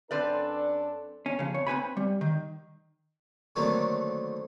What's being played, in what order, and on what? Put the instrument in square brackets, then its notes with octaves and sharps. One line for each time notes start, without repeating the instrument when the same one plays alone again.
[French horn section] F#2 D4 A4 [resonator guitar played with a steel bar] C4 B4 D5
[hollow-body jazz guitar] C#4
F2 C#3
C#5
C4 B4 G#5 B5
G3
D#3
[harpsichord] D3 D#3 F#3 A3 A#3 C4